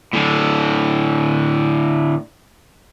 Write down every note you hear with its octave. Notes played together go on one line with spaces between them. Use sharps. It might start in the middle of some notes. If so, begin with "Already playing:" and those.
A2 D3